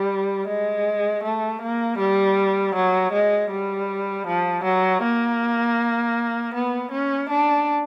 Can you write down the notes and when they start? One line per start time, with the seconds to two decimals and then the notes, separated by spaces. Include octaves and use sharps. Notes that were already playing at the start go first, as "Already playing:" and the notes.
Already playing: G3
0.48 G#3
1.24 A3
1.62 A#3
1.99 G3
2.75 F#3
3.12 G#3
3.51 G3
4.27 F3
4.64 F#3
5.03 A#3
6.54 B3
6.92 C#4
7.30 D4